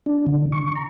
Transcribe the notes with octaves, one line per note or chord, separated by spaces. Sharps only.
D4
D3
C#6
A#5